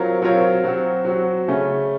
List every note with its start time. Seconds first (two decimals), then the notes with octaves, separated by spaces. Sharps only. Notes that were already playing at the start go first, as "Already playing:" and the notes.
Already playing: F#3 C4 F4 A#4 C#5
0.22 F#3 C4 F4 A#4 C#5
0.64 F#3 C4 F#4
1.05 F#3 C4 F#4
1.48 C#3 A3 C#4